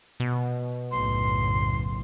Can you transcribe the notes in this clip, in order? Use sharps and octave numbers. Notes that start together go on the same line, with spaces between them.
B2
F#1 B1 A2 C6